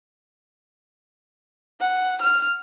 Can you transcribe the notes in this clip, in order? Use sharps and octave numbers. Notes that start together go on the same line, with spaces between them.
F#5
F6